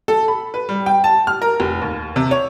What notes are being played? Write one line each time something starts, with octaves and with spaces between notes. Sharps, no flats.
A4
B5
B4
G3
G5
A5
F6
A#4
F1
D#2
C3
C#5